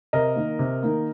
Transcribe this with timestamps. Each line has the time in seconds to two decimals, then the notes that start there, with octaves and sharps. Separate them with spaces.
0.13 C3 A#4 D#5
0.36 D#3 A#3
0.59 C3
0.83 D#3 A#3